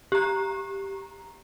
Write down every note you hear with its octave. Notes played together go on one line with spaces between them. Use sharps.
G4 A#5